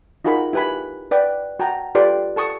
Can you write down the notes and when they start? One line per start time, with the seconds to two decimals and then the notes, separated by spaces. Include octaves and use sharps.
0.24 D#4 F4 F#4 G#4 A#4 B5
0.53 E4 G4 B4 G#5 B5
1.11 B4 D5 G5
1.60 F#4 G5 A5 A#5
1.95 F4 G4 A4 B4 D5 C6
2.36 A4 A5 C#6 D#6